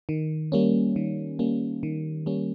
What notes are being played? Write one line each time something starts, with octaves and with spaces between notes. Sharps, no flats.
D#3
G3 A#3 C#4
D#3
G3 A#3 C#4
D#3
G3 A#3 C#4